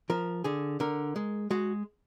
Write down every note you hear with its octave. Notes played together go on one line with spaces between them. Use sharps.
F3 A#4
D3 G#4
D3 A#4
G#3
G#3 F#4